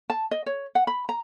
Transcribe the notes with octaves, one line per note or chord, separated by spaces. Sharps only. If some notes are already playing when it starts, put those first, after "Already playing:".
A5
D#5
C#5
F#5
B5
A#5